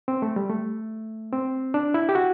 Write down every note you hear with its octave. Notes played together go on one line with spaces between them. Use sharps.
C4
A3
G3
A3
C4
D4
E4
G4
F#4